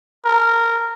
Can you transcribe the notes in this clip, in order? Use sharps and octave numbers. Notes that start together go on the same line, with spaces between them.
A#4